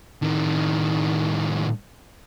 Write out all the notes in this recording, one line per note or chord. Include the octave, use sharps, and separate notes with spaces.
A2 D#3